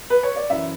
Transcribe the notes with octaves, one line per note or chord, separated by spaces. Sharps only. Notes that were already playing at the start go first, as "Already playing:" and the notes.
B4
C#5
D5
F#2 E3 E5